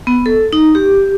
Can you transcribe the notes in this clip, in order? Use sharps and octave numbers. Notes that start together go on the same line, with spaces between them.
B3
A4
D#4
G4